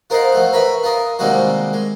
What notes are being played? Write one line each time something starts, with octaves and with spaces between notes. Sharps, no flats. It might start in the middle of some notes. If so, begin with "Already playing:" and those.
F4 A#4 C5 D#5 F5 F#5
F3 A3 F#4
A#4 B4 C#5 E5 B5
F4 A#4 D#5
C3 D#3 G3 G#3 A#3 F#4
G#3